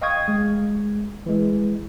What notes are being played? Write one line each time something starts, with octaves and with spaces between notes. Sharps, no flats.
D#5 F5 G5 C#6 D#6 G#6
G#3
E3 G#3